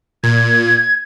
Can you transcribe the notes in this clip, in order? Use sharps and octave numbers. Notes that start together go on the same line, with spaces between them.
A#2 G#6